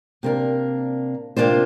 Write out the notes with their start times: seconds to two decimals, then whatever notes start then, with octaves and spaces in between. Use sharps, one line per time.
0.23 C3 A#3 D4 A#4
1.37 C3 A#3 D4 F4 C5